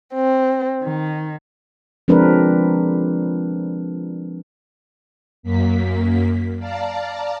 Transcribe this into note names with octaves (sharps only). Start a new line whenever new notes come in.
C4
D#3
F3 G#3 C4 D4 A#4 B4
F#2 A#3 B6
D5 F5 A5 A#5